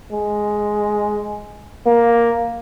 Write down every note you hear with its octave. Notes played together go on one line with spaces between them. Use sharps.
G#3
A#3